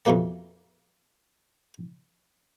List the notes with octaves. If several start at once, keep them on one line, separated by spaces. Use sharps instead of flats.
F2 B2 E3 G3 A#3 A5